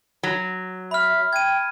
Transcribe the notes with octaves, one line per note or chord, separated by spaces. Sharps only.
F#3
E5 B5 F6
G5 G#6 D#7